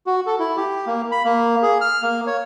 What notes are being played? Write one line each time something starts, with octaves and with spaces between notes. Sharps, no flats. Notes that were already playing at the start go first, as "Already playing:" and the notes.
F#4
A4
E4
G4
A#3
B5
A#3
G#4
F6
A#3
C#5